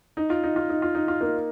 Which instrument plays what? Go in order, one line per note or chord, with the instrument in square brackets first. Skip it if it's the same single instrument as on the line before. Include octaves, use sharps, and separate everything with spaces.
[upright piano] D#4
F4
D#4
F4
D#4
F4
D#4
F4
A#3 D#4